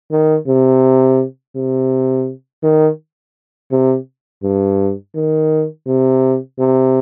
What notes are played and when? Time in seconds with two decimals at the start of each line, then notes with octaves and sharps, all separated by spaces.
0.12 D#3
0.48 C3
1.56 C3
2.64 D#3
3.71 C3
4.43 G2
5.15 D#3
5.87 C3
6.59 C3